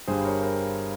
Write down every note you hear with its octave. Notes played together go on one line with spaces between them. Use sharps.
G1 G2 G3 G#4 C5
A#4 C#5
A#4 C#5